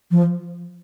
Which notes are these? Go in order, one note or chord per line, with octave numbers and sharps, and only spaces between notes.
F3